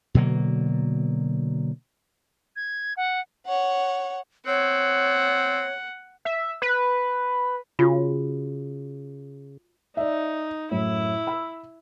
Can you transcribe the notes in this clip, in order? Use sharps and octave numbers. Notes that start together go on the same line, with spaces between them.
B2 D3 F#3 A#3
G#6
F#5
C#5 F#5
C4 C#5 F#5
E5
B4
C#3 F4 F#4
D#4 D5 E5
F#2 A2 E4
B5 E6